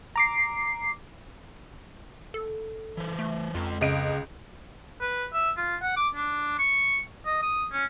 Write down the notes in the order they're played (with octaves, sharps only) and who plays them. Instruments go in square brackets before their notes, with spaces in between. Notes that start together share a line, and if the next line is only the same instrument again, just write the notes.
[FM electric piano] A#5 D6 C7
[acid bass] A4
[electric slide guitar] E3 C5
[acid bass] A3
[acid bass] F2 [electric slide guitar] G#3 F4
[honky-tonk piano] C#2 D#5 D7 [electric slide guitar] C#3
[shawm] B4
E5
F4
F#5
D6
D4
C#6
D#5
D#6
C#4